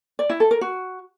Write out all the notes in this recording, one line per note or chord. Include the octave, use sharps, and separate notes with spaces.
D5
E4
A4
A#4
F#4